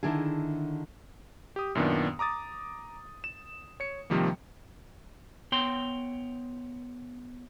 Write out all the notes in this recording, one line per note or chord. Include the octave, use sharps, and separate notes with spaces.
D3 D#3 D4 E4 G#4
G4 D#6
F#2 A#2 D#3 B3 D4
A#5 D6 D#6 A6
E7
C#5 C#7
C3 D#3 F3 G3 A#3
B3 C#5 G5 C6